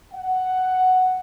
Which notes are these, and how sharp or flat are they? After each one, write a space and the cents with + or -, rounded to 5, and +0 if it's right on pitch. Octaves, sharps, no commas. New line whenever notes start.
F#5 +5